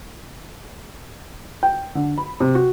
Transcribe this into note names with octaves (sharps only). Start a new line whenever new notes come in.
G5
D3
B5
C3
F#4